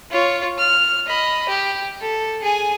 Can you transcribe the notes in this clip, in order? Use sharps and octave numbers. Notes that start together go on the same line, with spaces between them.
F4 C#5
F6
D#5 B5
G4
A4
G#4 G#5